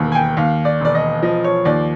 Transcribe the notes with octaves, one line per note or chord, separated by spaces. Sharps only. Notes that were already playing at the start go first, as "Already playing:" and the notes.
Already playing: E1 D#2
G#5
G5
D#2 F5
D5
E1 D5
D#5
F3 D#5
C#5
D#2 D5